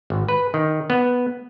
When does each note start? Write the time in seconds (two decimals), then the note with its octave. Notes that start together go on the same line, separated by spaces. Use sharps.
0.10 G#1
0.29 B4
0.54 D#3
0.90 B3